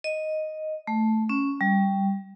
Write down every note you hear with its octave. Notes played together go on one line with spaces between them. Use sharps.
D#5
A3
C#4
G3